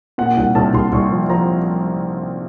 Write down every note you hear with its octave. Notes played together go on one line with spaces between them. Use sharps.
A#2 F#5
C2 F#5
C2 A5
C2 C6
C2 C#6
F3
F3 A#5